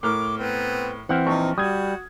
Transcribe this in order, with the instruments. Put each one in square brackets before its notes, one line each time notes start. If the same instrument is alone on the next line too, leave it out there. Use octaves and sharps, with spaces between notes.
[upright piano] A2 A#4 F6 [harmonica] D6
[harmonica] B3 C4
[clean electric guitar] E3 C4 [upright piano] F#5 F6
[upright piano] A#1 C#6 [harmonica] D#4
[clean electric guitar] G3 [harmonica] F#4 [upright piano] D#6 G#6